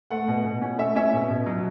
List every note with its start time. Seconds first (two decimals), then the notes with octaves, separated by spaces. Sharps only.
0.10 A3 F#5
0.28 B2
0.45 B2
0.61 C#4
0.78 A3 E5
0.96 C#4 E5
1.13 B2
1.30 B2
1.46 F#3